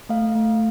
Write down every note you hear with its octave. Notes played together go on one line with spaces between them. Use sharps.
A3 F5
A3